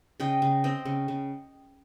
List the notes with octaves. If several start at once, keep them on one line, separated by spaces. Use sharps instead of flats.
C#3 D#5 G5
C#3
C4 D#5 G5
C#3
C#3